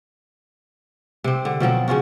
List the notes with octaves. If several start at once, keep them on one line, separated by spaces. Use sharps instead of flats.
C3 C4
D3
B2 F3 F#3 C4
C#3 C#4 F4 F#4